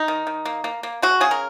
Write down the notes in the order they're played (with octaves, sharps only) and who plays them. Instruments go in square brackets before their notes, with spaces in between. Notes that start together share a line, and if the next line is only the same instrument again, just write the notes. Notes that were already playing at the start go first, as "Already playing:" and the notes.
Already playing: [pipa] D#4
D#3
D#3
A#3
A#3
A#3
G#3 F#4
C#3 G#4
A#4